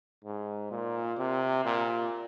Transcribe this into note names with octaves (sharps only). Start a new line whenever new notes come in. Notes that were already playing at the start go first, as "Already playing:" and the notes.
G#2
A#2
C3
A#2